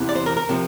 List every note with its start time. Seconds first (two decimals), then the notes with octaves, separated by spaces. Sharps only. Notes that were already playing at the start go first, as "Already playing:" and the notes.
Already playing: E2 C3 E3
0.09 D5
0.15 C5
0.26 A#4
0.37 A#4
0.49 C3 F3